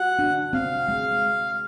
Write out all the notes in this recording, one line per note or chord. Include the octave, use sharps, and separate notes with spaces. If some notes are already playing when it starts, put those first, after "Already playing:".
Already playing: F#4 F#5
D4
C4 F5
G#3